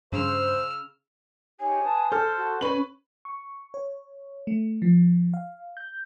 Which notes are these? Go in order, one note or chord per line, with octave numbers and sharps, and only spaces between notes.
G2 C#3 C5 E6 F6
D#4 G4 C#5 G#5
B4 A5 D#6
A4 C5 A5 C6 F6
F#4
C#4 B4 C#6 F#7
C#6
C#5
A3
F3
F5
G6